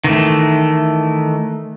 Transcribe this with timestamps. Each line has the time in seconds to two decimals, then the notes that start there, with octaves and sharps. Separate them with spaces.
0.04 D#3 E3 A3